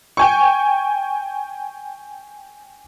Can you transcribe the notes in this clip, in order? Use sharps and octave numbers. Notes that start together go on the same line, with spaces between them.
G5 G#5 C#6